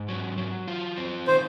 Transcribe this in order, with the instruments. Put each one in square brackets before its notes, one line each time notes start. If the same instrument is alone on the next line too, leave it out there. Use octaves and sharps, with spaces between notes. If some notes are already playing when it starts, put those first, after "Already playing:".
Already playing: [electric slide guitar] G#2
F#3
F#3
F4
C4
[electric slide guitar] D#3 [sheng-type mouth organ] C5